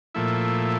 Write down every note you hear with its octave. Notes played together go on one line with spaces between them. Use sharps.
A#2 F3 A3 E4